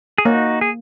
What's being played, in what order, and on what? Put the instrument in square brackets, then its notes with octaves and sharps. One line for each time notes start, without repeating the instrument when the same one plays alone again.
[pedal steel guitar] G#4
[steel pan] A#3 [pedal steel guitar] D#4 F#4
[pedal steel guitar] G#4